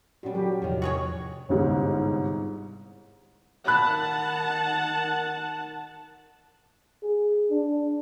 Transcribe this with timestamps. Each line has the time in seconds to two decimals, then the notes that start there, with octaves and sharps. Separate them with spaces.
0.23 A#2 G3 C#4 F#4
0.34 F#3 G4
0.62 E2 A2 C3 D#3 F3
0.82 F#4 G#4 C#5
1.49 G1 C2 G#2
3.67 D#3 F#5 A5 B5 F#6
7.03 G#4
7.51 D4